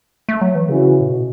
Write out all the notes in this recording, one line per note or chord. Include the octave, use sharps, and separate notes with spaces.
A3
F#3
E3
C#3 E3 C#4 F#4
A2
B2